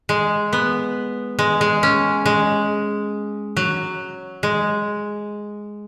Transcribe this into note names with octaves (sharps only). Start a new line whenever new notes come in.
G#3
B3
G#3
G#3
C#4
G#3
F#3
G#3